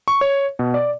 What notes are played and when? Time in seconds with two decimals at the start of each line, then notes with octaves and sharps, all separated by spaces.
0.08 C#6
0.21 C#5
0.59 B2
0.74 D5